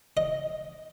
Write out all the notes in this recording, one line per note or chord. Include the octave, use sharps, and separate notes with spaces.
D#5